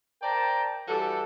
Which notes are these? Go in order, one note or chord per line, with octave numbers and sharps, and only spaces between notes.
A#4 C5 D5 G5 A5 A#5
E3 G3 F#4 A4